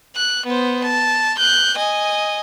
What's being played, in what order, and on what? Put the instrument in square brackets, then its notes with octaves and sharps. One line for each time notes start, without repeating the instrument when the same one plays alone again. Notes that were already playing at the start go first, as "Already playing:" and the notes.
[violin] F#6
B3 C5
A5
F#6 G6
D#5 G#5